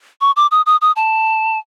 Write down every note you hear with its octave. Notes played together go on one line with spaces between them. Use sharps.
C#6
D6
D#6
D#6
D#6
A5